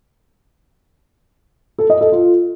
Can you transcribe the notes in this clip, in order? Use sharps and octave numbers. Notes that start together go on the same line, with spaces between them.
A4
D#5
A4
F4